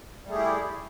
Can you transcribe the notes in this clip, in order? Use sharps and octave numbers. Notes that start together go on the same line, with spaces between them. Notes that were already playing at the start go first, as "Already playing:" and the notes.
G3 A3 E4 G4 G#4